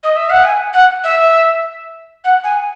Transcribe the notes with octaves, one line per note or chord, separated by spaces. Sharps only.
D#5
E5
F#5
G#5
F#5
E5
F#5
G#5